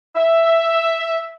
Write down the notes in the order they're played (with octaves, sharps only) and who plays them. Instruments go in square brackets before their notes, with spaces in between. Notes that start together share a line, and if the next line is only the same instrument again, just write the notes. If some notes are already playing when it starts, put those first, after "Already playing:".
[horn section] E5